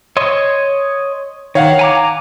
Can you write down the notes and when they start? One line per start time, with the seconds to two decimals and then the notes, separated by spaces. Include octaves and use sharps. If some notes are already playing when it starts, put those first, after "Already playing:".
0.17 C#5 D#5 C6
1.55 D#3 C#5 F5 F#5
1.79 G#5 A#5 D6